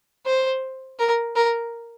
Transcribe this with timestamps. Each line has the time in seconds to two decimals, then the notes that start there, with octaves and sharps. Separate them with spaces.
0.26 C5
0.99 A#4
1.36 A#4